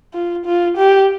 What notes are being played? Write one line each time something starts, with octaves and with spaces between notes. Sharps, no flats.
F4
F4
G4